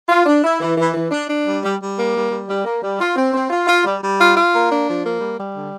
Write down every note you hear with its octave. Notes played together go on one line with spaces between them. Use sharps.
F4
D4
E4
E3
E3
E3
D4
D4
G3
G3
G3
A#3
G3
G3
G3
A#3
G3
F4
C4
C4
F4
F4
G3
G3
F4
F4
A#3
D4
F3
A#3
G3
G3
D3